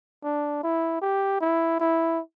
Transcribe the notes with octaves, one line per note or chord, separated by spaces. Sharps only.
D4
E4
G4
E4
E4